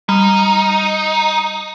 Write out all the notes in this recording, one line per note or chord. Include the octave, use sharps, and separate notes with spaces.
G3 D#4